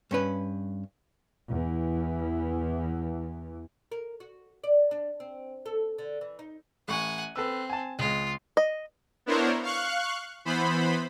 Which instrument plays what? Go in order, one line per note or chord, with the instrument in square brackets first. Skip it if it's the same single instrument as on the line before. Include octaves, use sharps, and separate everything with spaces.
[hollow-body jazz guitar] G2 C#4 B4
[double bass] E2 E3
[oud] A#4
F#4
D5
D4
C4
A4
D3
E3
D#4
[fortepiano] A1 C#6 [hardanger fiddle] F#5 G#5
[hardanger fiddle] C4 [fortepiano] A4 B4 E6
[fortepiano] G#5 A5
[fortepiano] C#2 G#3 [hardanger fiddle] F4
[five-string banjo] D#5
[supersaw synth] B3 D4 E4 A#4 C5 C#5
F5 C#6 F#6
E3 B3 C5 B5